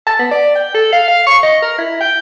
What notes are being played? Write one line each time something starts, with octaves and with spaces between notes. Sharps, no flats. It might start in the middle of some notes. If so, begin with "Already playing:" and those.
A5
B3
D5
G5
A4
F5
F5
C#6
D#5
A#4
E4
G5